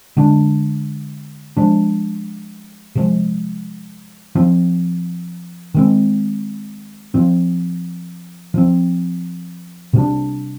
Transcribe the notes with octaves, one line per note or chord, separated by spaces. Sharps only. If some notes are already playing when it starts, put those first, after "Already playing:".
D3 G#3 D4
F3 G#3 D4
C3 F3 G#3
F3 C4
D#3 G#3 C4
F3 C4
F3 C4
C3 G3 D4